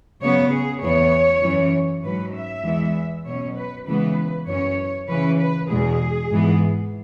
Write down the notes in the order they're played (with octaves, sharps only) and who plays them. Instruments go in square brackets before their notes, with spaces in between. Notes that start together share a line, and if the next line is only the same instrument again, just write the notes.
[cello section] C#3 F#3 B3 C#5
G#4
E2 E3 B3 C#5
F#2 E3 C#4
G#2 F#3 C#4 B4
E5
E2 E3 G#3 B3
B2 F#3 C#4 C#5
B4
C#3 E3 G#3 B3 B4
F#2 E3 C#4 C#5
C#3 E3 C#4 B4
B4
E2 B2 G#3 G#4
G#2 E3 B3